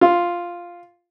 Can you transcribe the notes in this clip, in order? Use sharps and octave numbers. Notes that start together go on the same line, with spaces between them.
F4